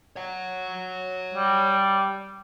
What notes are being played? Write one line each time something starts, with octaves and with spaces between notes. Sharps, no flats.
C#5 F#5
G3